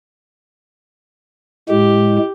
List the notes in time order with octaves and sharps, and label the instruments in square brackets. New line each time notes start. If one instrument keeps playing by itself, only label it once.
[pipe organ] A2 G#3 [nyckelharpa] G4